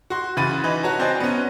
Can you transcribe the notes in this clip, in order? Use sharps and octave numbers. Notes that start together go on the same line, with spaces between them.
F#4 C6
C#3 E3 F#4 B5 A6 D#7
E3 D#4 B4
F#4 C#5 A5 A#5
C4 C5 D5 D#5 G#5
B3 C#4